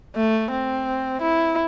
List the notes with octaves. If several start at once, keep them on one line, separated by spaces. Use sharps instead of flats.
A3
C4
E4